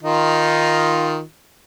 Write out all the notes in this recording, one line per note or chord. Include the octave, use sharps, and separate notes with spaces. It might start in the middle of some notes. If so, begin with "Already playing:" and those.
D#3 D#4 F4